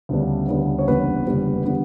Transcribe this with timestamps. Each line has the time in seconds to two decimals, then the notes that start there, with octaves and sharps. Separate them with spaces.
0.09 D2 C#3 G3 B3 D4
0.48 D2 C#3 G3 B3 D4
0.79 C#5
0.88 F#1 E2 D3 G3 B3 B4
1.27 F#1 E2 D3 G3 B3
1.65 D3 G3 B3